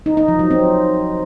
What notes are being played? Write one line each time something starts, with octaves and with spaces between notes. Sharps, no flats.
D#4
D#4
F3
F#3
C4